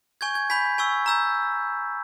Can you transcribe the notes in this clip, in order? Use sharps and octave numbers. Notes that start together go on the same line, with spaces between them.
G#5 C#6 G6 G#6
G#6
G#5 B5 G6 B6
G#5 C#6 E6
A#5 E6 G6